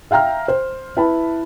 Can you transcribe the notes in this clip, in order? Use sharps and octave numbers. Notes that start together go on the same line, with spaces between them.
E5 F5 G5 A#5 F6
C5
E4 B4 A5 B5